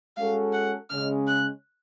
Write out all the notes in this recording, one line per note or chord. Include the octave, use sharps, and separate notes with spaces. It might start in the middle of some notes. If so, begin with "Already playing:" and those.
G#3 C#4 F#4 A4 F5
F#5
C#3 G#3 C#4 F6
F#6